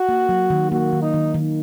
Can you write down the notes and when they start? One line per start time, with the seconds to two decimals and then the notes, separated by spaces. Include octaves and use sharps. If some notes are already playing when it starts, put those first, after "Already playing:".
Already playing: F#4
0.09 A#3
0.29 F#3
0.50 D#3
0.72 A#3 F#4
0.93 D#3
1.02 D#4
1.14 D#3
1.34 D#3